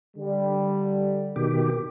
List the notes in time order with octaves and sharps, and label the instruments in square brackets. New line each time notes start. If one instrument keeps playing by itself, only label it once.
[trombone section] D3 G3
[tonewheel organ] B2 D#3 G4